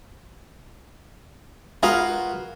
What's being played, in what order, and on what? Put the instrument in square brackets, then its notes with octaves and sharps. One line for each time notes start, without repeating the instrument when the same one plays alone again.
[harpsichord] F4 F#4 A#4 [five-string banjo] G#4 B4 F5